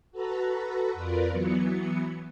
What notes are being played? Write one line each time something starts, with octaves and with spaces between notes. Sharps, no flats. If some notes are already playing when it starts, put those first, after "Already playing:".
F#4 A4 B4 A#5
F2 F4 A#4 B4 D5
E3 F#3 B3 C#7